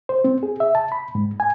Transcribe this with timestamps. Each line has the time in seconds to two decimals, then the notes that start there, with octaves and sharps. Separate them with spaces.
0.09 C5
0.24 C4
0.43 G#4
0.60 E5
0.75 A5
0.92 B5
1.15 G#2
1.40 G#5